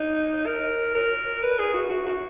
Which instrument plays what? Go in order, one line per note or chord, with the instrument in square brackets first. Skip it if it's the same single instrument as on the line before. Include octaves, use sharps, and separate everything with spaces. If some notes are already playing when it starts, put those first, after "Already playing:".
Already playing: [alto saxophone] D#4
A#4
A#4
B4
G#4
F#4
F#4
F#4